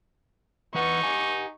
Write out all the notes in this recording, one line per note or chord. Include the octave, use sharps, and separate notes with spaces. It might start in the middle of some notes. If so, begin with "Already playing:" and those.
E3 D#4 B4 F#5 C#6
G4 F#5 G#5